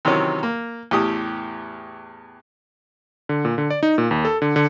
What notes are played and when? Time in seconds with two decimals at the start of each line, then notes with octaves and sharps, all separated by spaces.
0.05 C3 D#3 E3 F#3 C#4
0.43 A#3
0.91 E2 A2 G4 D#6
3.29 D3
3.45 A#2
3.58 D3
3.70 D5
3.83 D#4
3.98 A#2
4.11 D#2
4.25 A4
4.42 D3
4.56 D3